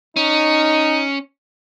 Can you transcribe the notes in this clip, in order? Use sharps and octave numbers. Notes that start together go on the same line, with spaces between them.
C#4 D#4